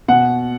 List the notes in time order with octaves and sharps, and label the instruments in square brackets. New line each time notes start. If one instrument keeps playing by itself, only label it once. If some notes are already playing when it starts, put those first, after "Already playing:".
[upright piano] B2 F#5